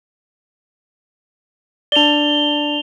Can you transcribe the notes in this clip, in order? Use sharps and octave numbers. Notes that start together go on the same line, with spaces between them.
D4 D5 F7 G7